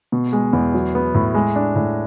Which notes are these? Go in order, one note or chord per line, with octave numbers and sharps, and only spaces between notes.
B2
G#3
E2
F#3
B3
A2
G#3
D4
A2